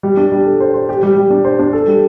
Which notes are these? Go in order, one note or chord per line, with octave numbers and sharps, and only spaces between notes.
G3
D4
G3
A4
C5
C5
G4
G3
G3
D4
C5
D4
A4
G3